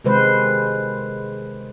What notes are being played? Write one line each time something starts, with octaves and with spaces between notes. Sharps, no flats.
C3 D#3 G#3 B4 C5